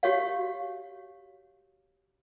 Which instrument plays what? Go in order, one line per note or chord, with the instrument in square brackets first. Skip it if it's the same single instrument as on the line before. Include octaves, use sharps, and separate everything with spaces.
[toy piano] F#4 G4 C#5 F5